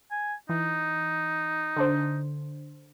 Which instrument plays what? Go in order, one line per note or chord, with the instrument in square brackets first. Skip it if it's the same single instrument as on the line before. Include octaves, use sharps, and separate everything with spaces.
[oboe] G#5
[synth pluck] E3 [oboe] D#4
[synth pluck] D3 D4 C5